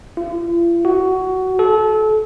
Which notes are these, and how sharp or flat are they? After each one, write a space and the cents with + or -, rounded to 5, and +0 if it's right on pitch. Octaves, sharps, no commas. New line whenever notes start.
F4 -45
F#4 +15
A4 -30